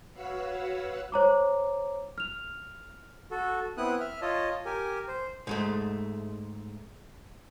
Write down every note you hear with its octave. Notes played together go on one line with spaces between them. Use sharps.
F#4 B4 C#5 F5 F#5 E6
C5 C#5 A#5 D6
F6 F7
F#4 A4
B3 C4 E4 D#6 F#6
E5 F6
F4 C#5 D#5 A5
G4 A#4 G#5
C5
G#2 G#3 A3